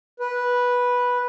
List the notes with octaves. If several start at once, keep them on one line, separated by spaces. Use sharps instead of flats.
B4